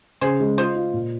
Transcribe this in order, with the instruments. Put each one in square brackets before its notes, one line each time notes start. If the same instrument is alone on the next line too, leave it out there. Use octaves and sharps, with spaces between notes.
[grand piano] C#3 [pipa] G#4 C5
[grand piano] G#3
[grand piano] F4 [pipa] C5 D#5
[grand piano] F4
A#2